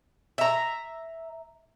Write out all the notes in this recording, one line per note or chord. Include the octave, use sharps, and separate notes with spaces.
E5 A#5